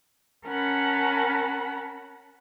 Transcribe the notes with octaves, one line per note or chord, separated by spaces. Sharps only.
C#4 A#4 F#5 A5 B5